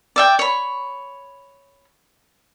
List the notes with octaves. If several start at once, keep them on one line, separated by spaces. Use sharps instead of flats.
D5 E5 G5
C#5 B5